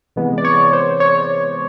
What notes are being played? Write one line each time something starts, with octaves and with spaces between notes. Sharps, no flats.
C3 E3 G#3 B3
D5
C#5
C5
C#5